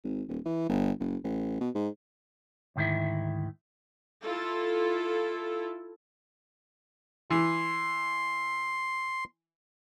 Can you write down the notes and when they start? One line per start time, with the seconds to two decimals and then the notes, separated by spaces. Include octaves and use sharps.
0.04 G#1
0.28 D#1
0.45 E3
0.69 G1
1.00 F#1
1.24 A1
1.60 B2
1.74 G#2
2.76 D2 G#2 D#3 E4 E5
4.25 E4 F4 A4
7.30 E3 C6